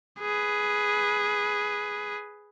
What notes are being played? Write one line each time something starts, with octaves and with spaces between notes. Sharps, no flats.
G#4 B4